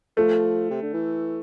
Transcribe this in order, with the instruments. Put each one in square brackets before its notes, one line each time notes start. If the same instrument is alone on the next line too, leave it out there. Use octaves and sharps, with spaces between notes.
[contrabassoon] F3 [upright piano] A3
[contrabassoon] C3
D3
E3